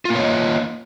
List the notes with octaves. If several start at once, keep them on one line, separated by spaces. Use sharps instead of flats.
A#3 F4 C#5 D#5